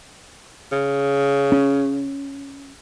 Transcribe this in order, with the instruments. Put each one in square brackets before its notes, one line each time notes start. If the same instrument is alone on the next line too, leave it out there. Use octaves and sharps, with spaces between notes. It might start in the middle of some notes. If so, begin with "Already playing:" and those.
[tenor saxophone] C#3
[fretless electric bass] C#4